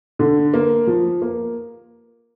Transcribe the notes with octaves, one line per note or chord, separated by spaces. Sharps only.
D3
A#3
F3
A#3